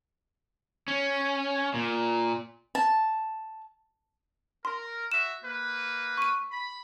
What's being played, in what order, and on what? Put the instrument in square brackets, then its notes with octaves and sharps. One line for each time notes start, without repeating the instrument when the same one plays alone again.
[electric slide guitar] C#4
A#2
[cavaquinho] A5
[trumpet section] A#4 [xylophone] C6
[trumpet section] F#4 E5 [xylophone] E7
[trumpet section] A#3 B4
[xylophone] C#6 D#7
[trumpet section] B5